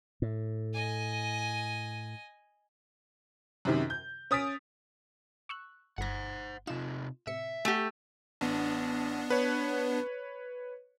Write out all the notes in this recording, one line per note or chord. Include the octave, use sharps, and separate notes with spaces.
A2
D#5 G#5
F#2 C3 D#3
G6
C#4 D#6 A6 B6 D7
C#6 E6 F#6
G1 C5 F#5 A#6
C3 D#4 F4 E7
A2 C3 E5 C#7
A3 G4 F#5 G#5
A1 B3 D4
B4 C#5